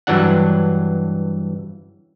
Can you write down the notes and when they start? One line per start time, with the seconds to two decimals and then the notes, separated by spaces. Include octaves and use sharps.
0.07 G2 E3 F#3 D4 F#5